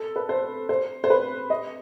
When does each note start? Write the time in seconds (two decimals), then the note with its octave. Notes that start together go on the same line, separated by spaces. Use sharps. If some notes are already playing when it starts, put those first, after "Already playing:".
Already playing: A4
0.16 B4
0.29 C5
0.69 C5
1.04 C5
1.10 B4
1.50 D#5